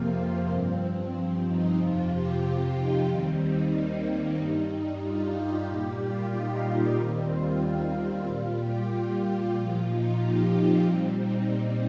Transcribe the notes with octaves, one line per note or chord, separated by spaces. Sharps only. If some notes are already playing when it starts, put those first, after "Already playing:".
Already playing: F2 C3 F3 A#3 C4 F4
C4
G2 F3 C4
D#4
F2 C3 F3 F4
G4
F4
D#4
D#2 D#3 G3 C4
D#4
A#3
C4
G2 G3 D#4
F4
G4
A#2 G3 G4
F4
D#4
A#3
D#2 D#3 G3 C4
F4
A#2 G3
G4
F4
A#2 F3
D#4
G4
C4
A#2 G3
D#4